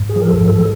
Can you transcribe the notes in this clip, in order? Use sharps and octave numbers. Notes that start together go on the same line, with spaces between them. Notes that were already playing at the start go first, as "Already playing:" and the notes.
Already playing: G#2
G#4
F3
A#4
A4
G#2
A4